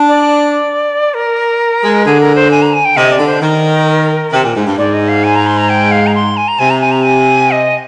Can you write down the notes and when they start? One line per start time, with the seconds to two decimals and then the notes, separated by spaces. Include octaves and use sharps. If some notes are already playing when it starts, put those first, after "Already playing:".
Already playing: D4
0.08 D5
1.14 A#4
1.83 G#3
2.05 D3 G#4
2.20 A#4
2.35 C5
2.51 G#5
2.62 A#5
2.74 G#5
2.85 G5
2.96 C3 D#5
3.12 D5
3.19 D3
3.27 C5
3.42 D#3 A#4
4.33 C3
4.44 A#2
4.55 G#2
4.67 G2
4.78 G#2 D5
4.94 D#5
5.08 F5
5.24 G#5
5.35 A#5
5.47 C6
5.58 A#5
5.69 G5
5.92 F5
6.07 A#5
6.15 C6
6.37 G#5
6.48 A#5
6.59 C3 G#5
6.70 A#5
6.81 G#5
6.92 A#5
7.03 G#5
7.51 D#5